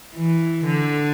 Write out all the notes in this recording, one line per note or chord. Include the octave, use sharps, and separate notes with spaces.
E3
D3